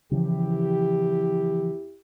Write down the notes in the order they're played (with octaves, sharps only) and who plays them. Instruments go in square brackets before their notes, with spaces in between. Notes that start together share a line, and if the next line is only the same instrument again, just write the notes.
[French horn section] E2 E4 G4 [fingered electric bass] C#3 E3 F3